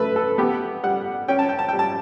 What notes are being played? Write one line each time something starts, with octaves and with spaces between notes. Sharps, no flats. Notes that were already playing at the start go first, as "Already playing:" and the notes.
Already playing: A3 B4
A4
B3 G4
G3 F#5
C#4 G5
A5
G5
A5
G3 G5
A5